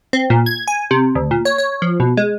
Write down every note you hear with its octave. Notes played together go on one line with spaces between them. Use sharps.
C4
A#2
G#6
G#5
C3
D2
A#2
C#5
C#5
F3
B2
G#3